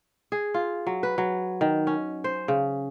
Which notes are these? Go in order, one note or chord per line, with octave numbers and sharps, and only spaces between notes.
G#4
F4
F#3
B4
F#3
D#3
C#4
C5
C#3